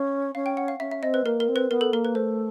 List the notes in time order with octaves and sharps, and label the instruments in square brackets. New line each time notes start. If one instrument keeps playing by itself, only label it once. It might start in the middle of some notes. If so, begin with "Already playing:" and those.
Already playing: [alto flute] C#4 [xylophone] F5
[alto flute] C#4 [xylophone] F5
[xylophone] G5
F#5
F5
[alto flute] C#4 [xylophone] E5
[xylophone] E5
[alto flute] C4 [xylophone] D#5
[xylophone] B4
[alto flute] A#3 [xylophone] A#4
[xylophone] A#4
[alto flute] C4
[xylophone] B4
[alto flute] B3 [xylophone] A#4
[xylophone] A4
[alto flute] A#3 [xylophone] A#4
[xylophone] B4
[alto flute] A3 [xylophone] C5